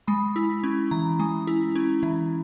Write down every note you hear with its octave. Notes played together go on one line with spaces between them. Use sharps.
G#3 B5
E4
C#4
E3 A#5
G#3
E4
C#4
E3